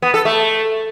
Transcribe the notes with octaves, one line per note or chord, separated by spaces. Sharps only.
B3
A4
A3